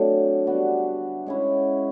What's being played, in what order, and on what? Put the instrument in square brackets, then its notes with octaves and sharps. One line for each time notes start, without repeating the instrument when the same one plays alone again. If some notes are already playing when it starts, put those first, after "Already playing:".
Already playing: [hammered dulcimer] D3 F#3 A3 C4 D4
G3 B3 D4 F#4
G#3 C#4 E4